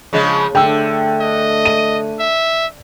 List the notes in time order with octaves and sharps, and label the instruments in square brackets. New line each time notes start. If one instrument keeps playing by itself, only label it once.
[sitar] C#3 F3 G#3
[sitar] D3 [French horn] A3 [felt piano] G5 E6
[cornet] D#5
[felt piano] D#7
[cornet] E5